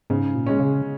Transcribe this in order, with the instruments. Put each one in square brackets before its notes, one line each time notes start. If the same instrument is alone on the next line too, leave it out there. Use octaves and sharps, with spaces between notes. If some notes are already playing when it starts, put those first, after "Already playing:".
[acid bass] G#2 [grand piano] C#3
[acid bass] A#2
[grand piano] G#3 C#4
[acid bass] C#3